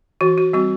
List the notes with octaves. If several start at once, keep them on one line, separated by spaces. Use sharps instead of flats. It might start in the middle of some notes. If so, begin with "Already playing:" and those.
E3 F#4
F#4
G3 C4 F#4